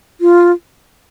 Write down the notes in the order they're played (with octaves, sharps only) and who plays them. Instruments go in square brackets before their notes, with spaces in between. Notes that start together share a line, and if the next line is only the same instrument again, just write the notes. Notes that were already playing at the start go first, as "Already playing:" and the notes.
[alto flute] F4